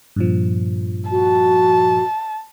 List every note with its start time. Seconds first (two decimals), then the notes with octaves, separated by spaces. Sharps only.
0.16 G2 A#2 F3
1.10 F#4 A5